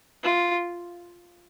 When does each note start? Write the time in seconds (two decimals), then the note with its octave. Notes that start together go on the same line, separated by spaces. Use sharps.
0.23 F4